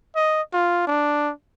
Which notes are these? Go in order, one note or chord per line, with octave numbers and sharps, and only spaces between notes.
D#5
F4
D4